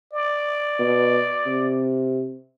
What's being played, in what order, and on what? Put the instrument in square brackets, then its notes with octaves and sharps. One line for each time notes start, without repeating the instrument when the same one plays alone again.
[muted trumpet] D5
[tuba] B2
C3